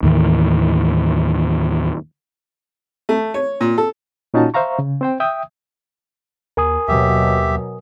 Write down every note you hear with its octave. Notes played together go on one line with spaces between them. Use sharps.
D#2 A2 D#3 E3
A3
C#5
A#2
A4
A#2 C#4 D#4 F4 F#4 A5
C5 E5 F5 A#5 C#6
C#3
C4 C5 G5
E5 G5 D#6
D#2 A#4 G#5 D#6
D#2 B2 F#3 G4 E5